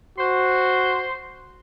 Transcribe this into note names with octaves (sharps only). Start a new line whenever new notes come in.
F#4 C5